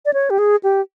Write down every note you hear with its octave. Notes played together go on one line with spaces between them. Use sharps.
D5
C#5
G4
G#4
G4